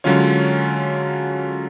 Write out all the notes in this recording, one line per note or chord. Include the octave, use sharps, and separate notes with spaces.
D3 F#3 G#3 C#4 F4 C#5